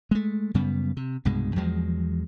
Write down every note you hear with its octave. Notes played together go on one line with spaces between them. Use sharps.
G#3 A3
F#2 C#3 G3 B3
C3
C2 G2 B2 G#3
E2 F3 F#3 G#3